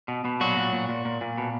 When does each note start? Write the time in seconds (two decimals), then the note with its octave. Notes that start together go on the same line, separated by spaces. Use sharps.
0.08 B2
0.25 B2
0.40 A#2 F#3 F#4
0.57 A#2
0.73 A#2
0.89 A#2
1.05 A#2
1.21 A#2
1.38 B2